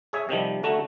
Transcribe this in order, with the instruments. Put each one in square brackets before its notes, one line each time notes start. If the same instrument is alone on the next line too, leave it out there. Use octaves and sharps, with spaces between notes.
[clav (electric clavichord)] G#4 C#5 E5
C3 D#3 F3 G3
D3 A3 F#4 A#5